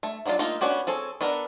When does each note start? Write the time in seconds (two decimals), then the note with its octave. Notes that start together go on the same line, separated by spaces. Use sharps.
0.03 A3
0.26 F#3 G3 D4 D#4 F4
0.39 A3 A#3 D#4 F4
0.61 B3 C#4 D4 F#4 G4
0.87 C4 G#4 A4 C#5
1.21 B3 D4 A4 A#4